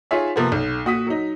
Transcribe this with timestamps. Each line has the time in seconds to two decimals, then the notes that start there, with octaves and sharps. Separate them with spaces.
0.11 D#4 F4 G#4 C#5 E5
0.36 C3 F3 A#3 B3
0.52 B1
0.85 A#2 F#4 D#6 B6
1.07 F#3 D#4